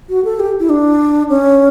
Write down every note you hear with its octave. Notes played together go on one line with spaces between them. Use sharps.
F#4
A4
G4
E4
D4
C#4